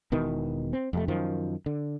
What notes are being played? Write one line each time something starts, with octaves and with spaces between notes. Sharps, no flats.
E1 B2 D#3 E3
C4
F2 C3 A3
F#2 D#3 F3
D3